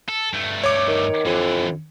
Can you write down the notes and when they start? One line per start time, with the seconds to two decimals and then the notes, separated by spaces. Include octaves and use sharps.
0.09 A4
0.33 G2 A3
0.64 C#5 D6
0.88 D#3
1.26 F2 D3 E3